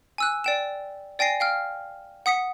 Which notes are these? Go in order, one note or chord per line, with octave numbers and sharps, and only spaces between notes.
G#5 E6 F#6
D5 G5 E7
D5 G5 G#5 A#6 C7
F5 G5 F6
F#5 D#6 B6 C#7